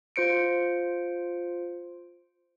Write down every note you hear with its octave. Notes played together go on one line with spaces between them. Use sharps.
F4 C5 C#7 D7